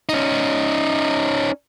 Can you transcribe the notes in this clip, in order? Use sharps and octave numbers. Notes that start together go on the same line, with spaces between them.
C#4 D#4